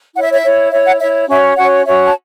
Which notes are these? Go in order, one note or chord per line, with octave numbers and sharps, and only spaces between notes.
E4 C#5 F#5
E5
C#5
E5
E4 C#5
E4 C#5 E5
F#5
E4 C#5 E5
C#4 F#4 C#5 E5
C#4 F#4 C#5 F#5
C#4 F#4 C#5 E5
A5